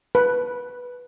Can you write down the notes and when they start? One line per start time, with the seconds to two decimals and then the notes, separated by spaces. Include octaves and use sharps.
0.15 B4